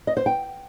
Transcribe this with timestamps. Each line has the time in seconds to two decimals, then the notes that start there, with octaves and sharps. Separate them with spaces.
0.07 D#5
0.17 C5
0.26 G5